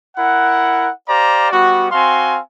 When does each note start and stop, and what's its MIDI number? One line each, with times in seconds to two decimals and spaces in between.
0.17 0.90 64
0.17 0.90 70
0.17 0.90 78
1.09 1.50 67
1.09 1.50 72
1.09 1.50 74
1.09 1.50 77
1.09 1.50 82
1.52 1.88 55
1.52 1.88 59
1.52 1.88 66
1.92 2.39 60
1.92 2.39 66
1.92 2.39 77
1.92 2.39 80
1.92 2.39 84